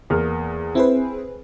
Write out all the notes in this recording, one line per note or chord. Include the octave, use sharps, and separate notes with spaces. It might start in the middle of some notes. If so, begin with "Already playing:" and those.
E2 A#3 F6
C4 E4 G#4 B4 C5